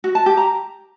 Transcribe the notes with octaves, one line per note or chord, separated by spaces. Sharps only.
F#4
A5
G4
A#5